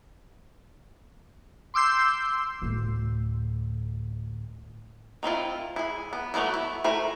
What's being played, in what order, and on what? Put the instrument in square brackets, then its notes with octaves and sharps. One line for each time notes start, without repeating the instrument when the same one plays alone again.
[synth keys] C6 D6 E6 G6 C7
[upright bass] D2 A2
[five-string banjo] D#3 C4 E4 F4
E4 G#4
B3
E3 F#3 A3 B3 E4
E4
A3 E4 A#4 C5